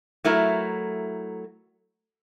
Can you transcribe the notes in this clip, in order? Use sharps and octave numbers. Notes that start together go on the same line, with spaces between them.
F#3 A3 E4 A#4